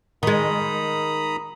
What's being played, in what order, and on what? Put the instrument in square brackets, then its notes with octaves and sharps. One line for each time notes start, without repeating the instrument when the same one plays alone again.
[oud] D#3 G#3 [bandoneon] A#5 B5 D#6